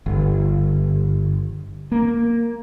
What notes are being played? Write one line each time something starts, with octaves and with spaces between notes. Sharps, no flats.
G1
A#3